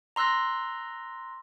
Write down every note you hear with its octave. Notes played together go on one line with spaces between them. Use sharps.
A#5 C6 E6 F#6 A#6